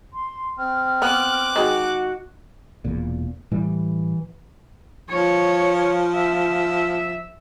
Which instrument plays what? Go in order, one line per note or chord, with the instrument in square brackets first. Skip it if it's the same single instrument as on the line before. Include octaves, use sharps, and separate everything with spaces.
[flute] C6
[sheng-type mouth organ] C4 [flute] F6
[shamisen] B3 [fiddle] D6 F#6
[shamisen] D#3 G#3 [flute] F#4
[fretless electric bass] E1 E2 A#2
[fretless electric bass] A2 G3 [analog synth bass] E3
[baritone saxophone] F3 [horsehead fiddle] C#5
[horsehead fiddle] E5